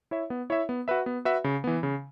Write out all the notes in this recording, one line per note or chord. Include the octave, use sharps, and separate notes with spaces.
E4 C#5 E5
B3
E4 C#5 E5
B3
F#4 B4 E5
B3
F#4 B4 E5
C#3
E3 B3
C#3